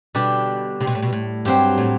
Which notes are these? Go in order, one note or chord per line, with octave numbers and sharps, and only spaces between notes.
B2 D3 G3 D4 G4
C3
B2
A2
B2
A2
G2 F#3 C4 G4
A2